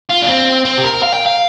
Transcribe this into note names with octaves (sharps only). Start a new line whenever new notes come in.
F4
D4
C4
C4
G4
A#4
F5
G5
F5